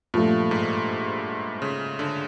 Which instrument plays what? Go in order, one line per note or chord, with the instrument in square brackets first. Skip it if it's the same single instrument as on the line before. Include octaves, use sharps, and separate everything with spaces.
[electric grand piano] G2 [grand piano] A#2 F3 A3
[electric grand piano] G#2
C#3
D3